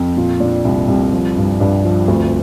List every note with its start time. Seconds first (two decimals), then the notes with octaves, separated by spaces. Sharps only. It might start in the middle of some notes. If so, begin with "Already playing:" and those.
Already playing: F2
0.16 A#2 F4
0.40 A#2 D4
0.65 C2
0.88 C2
1.13 F3
1.37 G2
1.60 G2 D4
1.84 F3
2.08 D2 C4